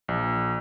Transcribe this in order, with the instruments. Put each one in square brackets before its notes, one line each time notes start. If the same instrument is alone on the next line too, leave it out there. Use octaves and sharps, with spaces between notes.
[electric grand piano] A#1